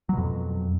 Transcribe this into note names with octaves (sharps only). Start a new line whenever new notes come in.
F2 B2 F#3